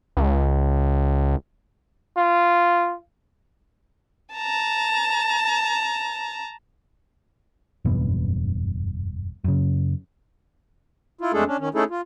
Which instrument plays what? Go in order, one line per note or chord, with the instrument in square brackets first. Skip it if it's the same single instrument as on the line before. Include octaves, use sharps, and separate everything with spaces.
[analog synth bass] C#2
[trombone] F4
[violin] A5 A#5
[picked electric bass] F#1 E2 G2 B2
F#2 C#3
[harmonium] E4 F4
F2 G#3 A3 D4 G#4 A4
C#4 D4
D#3 C#4
A3 C#4 D#4 E4 G#4 A4
F4